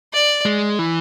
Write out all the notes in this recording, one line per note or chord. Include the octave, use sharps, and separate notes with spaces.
D5
G#3
E3